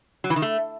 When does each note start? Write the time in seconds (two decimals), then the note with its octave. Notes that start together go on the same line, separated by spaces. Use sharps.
0.24 F#3
0.30 E3
0.36 D#3
0.42 A3